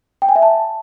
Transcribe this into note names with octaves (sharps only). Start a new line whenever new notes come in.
G5
G#5
E5
A5